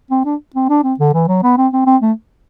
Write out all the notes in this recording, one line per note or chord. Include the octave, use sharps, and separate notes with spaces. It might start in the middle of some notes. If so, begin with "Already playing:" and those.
C4
D4
C4
D4
C4
D3
E3
F#3
B3
C4
C4
C4
A3